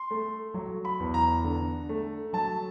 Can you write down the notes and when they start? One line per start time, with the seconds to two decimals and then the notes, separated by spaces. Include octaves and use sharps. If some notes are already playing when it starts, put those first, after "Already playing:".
Already playing: C6
0.11 A3
0.54 F#3
0.85 B5
1.00 E2
1.14 A#5
1.44 D3
1.89 A3
2.33 F#3 A5